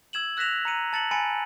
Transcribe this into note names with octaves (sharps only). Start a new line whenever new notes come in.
E6 G#6 E7 F#7
E6 F#6 A#6 B6 E7 F7
A#5 C#7 D#7
A5 A6 C#7 F#7
G#5 B5 A6 C#7 D#7